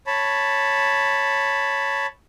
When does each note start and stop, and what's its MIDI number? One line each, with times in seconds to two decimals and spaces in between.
0.07 2.06 73
0.07 2.06 81
0.07 2.06 83